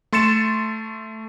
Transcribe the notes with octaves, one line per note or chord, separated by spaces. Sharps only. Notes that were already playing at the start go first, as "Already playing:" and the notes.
A3 C6 A6 C#7 E7